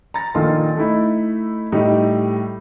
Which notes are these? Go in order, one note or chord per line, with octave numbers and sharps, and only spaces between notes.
A#5 A6
A#1 D#3 F4 A4 C6
A3 D#4 E4
A2 G3 A3 D#4